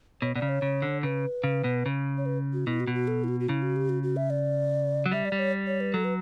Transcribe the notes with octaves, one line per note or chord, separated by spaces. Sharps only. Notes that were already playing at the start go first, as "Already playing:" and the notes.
B2 C#5
B2 D5
C#3
C#5
C#3
D3
C#3 B4
C#3
B2
C#3
C#5
B4
F#4
B2 E4
F#4
B2
F#4
A4
E4
F#4
F#4
C#3 E4
F#4
G4
F#4
F#4
E5
D5
F#3
G3 E5
D5
G3
C#5
C#5
B4
F#3 A4
B4